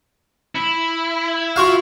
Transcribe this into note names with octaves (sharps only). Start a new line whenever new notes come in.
E4
F4 F#4 F5